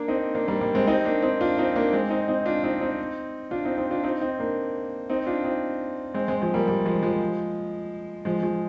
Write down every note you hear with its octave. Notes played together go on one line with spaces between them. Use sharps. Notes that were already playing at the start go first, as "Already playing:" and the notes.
Already playing: A#3 D4
C4 D#4
A#3 D4
G3 A#3
G3 A#3
G#3 C4
C4 D#4
A#3 D4
C4 D#4
D4 F4
C4 D#4
A#3 D4
G#3 C4
C4 D#4
C4 D#4
D4 F4
C4 D#4
C4 D#4
D4 F4
C4 D#4
C4 D#4
D4 F4
C4 D#4
C4 D#4
A#3 D4
C4 D#4
D4 F4
C4 D#4
G#3 C4
G#3 C4
F3 G#3
G3 A#3
G3
F3 G#3
F3 G#3
F3 G#3
F3 G#3